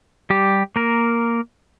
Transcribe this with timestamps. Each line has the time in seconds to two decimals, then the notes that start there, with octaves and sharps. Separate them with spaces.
0.30 G3 G4
0.76 A#3 A#4